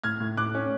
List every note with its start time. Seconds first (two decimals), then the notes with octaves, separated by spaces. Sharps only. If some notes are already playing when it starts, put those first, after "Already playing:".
0.04 A2 F6 G#6
0.20 A2
0.37 A2 D6 F#6
0.55 C#4